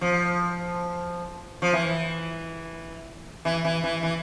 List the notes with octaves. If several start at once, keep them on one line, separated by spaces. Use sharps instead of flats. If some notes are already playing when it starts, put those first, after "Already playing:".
F3
F3
E3
E3
E3
E3
E3